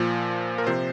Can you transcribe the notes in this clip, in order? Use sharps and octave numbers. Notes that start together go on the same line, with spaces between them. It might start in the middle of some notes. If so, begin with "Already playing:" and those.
Already playing: A#2 F3
A#4
C3 F3 C5